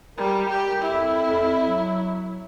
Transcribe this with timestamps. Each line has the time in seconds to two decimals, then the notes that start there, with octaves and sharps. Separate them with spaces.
0.17 G3 A#4
0.50 G4
0.82 F2 E4
1.24 F2
1.64 F#3